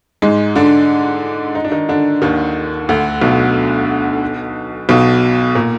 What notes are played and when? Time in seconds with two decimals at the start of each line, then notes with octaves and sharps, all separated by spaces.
0.22 G#2 G#3
0.56 D3 D4
1.55 D#4
1.65 D4
1.72 D#3 D#4
1.89 D3 D4
2.22 D#2 D#3
2.89 D2 D3
3.22 B1 B2
4.89 B1 B2
5.55 A#2